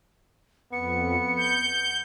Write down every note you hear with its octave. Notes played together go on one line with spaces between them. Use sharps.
F2 B3 C#7
G6